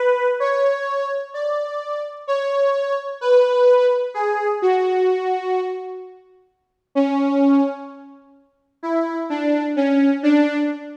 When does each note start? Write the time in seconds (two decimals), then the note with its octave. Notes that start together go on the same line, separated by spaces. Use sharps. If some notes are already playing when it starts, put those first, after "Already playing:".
Already playing: B4
0.40 C#5
1.34 D5
2.27 C#5
3.21 B4
4.14 G#4
4.62 F#4
6.95 C#4
8.83 E4
9.30 D4
9.76 C#4
10.23 D4